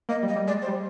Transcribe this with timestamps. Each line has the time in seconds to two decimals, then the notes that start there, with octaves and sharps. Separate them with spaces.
0.09 A#3 D#5
0.23 G3
0.28 D#5
0.36 G3
0.48 G#3 D5
0.62 C5
0.68 G3